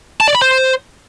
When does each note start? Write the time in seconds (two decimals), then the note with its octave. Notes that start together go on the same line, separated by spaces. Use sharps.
0.21 A5
0.28 D5
0.35 B5
0.42 C5